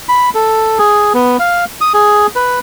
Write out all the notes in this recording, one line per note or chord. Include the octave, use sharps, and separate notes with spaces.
B5
A4
G#4
B3
F5
D#6
G#4
B4